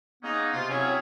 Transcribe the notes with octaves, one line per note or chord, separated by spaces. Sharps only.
G#3 A#3 B3 C#4 D#4
C3 F4
F#3 C4 C#4 E4 G#4 C#5